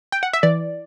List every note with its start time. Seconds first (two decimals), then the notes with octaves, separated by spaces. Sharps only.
0.12 G5
0.23 F#5
0.33 E5
0.43 E3 D5